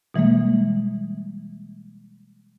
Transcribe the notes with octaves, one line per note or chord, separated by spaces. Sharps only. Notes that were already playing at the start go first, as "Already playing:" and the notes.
B2 E3 G3 G#3 A#3